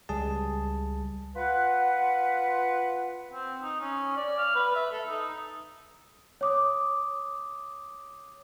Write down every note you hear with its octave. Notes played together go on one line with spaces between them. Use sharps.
C#2 G3 G#4 A5
F4 B4 F#5
C4
D#4
C#4
D5
F5
B4
E5
A4
D#4
C#5 D6 D#6